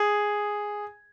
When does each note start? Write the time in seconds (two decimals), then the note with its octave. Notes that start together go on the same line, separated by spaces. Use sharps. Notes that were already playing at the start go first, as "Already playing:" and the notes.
Already playing: G#4